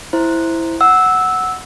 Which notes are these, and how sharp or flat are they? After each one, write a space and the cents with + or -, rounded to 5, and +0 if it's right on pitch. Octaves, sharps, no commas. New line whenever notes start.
E4 +0 C5 +0
F#5 +0 E6 -10